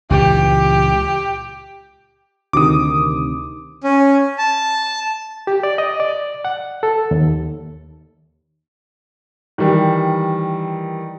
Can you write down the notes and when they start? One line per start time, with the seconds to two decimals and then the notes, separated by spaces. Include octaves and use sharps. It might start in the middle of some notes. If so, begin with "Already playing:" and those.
0.10 C#2 A#2 E3 G4
2.53 D2 C3 D#3 D6 D#6
3.84 C#4
4.38 A5
5.47 G4
5.63 D5
5.78 D#5
6.00 D5
6.45 F#5
6.83 A4
7.11 D#2
9.58 D#3 E3 G3